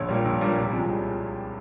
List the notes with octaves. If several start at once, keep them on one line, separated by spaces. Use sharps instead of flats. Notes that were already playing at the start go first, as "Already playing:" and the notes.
Already playing: A#1 C#5
A#2 G3
A#1
A#2 G3
C2
C3 F3 G#3
C2